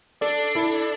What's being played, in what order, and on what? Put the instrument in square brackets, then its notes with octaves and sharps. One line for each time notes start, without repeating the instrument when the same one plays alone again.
[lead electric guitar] D4 [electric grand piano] A4 D5
[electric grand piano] E4 A4